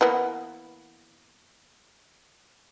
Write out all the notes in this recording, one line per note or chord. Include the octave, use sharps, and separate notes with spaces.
E3 A#3 B3